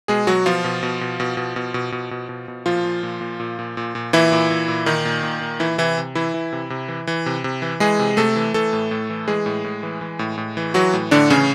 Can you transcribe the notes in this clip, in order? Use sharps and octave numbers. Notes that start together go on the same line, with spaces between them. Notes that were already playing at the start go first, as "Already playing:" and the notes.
B2 G#3 G#4
B2 F#3 F#4
B2 F3 F4
B2
B2
B2
B2
B2
B2
B2
B2
B2
B2
B2
A#2 F3 F4
A#2
A#2
A#2
A#2
A#2
A#2
A#2
A#2 E3 E4
A#2
A#2
A#2
A#2 D#3 D#4
A#2
A#2
A#2
E3 E4
C3 E3 E4
C3
E3 E4
E3
C3
C3
E3
E3
C3
C3
E3
E3 G#3 G#4
C3
C3 A3 A4
E3
E3 A3 A4
A2
A2
E3
E3 G#3 G#4
A2
A2
E3
E3
A2
A2
E3
E3 F#3 F#4
A2
A2 D3 D4
C#3 E3 C#4